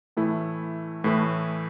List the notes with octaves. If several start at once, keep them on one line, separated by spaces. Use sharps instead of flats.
A2 E3 A3 E4
A2 E3 A3 E4